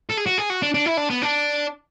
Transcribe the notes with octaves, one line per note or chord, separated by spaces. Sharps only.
A4
G#4
F#4
G#4
F#4
D4
D4
E4
D4
B3
D4